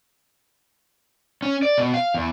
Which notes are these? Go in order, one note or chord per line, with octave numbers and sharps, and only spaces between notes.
C#4
D5
B2
F5
E2